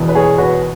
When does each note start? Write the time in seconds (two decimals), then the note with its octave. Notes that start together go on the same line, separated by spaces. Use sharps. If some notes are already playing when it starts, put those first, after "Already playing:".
Already playing: E1 E2 B2
0.09 B4
0.15 G#4 C#5
0.38 F#4 B4